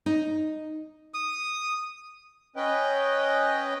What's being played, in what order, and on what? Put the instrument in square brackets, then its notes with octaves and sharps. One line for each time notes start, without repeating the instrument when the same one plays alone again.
[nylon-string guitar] D#4
[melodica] D#6
[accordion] C#4 B4 D#5 G5